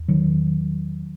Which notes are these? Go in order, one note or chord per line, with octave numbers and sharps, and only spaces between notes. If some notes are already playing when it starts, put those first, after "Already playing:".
Already playing: E2
D#3 F#3